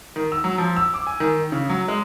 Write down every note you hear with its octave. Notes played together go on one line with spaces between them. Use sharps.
D#3
E6
F#3
F3
E6
D6
G#5
D#3
C#3
F#3
G#3